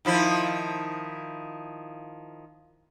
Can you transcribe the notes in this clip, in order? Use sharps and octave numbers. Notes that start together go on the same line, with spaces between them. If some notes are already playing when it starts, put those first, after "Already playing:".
D#3 F3 E4